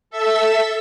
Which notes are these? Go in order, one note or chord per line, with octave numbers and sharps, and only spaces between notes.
A4 E5 E6